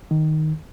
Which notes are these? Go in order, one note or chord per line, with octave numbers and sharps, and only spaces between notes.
D#3